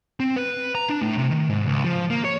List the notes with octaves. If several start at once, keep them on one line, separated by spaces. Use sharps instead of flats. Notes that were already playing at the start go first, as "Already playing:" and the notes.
C4
B4
A#5
D4
A2
C3
D#3
G#2
C#2
F3
A#3
C#5